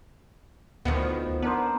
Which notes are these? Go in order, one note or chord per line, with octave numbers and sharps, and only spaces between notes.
D2 D#3 F3 B3
B3 D4 A#4 C5